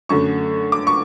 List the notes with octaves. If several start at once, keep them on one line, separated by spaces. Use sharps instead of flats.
F#2 D3 A3 C#6
D6
C#6